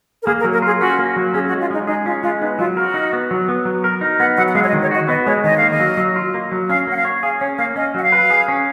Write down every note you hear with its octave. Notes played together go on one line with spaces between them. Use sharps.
A#4
A#3 G#4
A#4
F#3
A#4
F4 G#4
C#4 F#4
A#3
F#3
C#4 G#4
F#4
G#3
F4
G#3 D#4
D#4 G#4
C#4 F4
G#3 F4
B3 D#4
F#3 F4
F#4 A#4
D#4
B3
F#3
B3
F#3
A#4
D#4
B3 F#5
F#3 F#5
F#5
G#3 F5
C#5
D#5
D#3
C#5
F#4 D#5
B3 D#5
G#3 C#5
D#3 D#5
A#3 F5
D#5
F#3
F#3
F4
A#3
F#3
C#4 F5
A#3 F#5
F5
C#5
G#4 F5
C#4 C#5
A#3 F5
C#4 D#5
F#3 F#5
F5
B4
G#4
C#4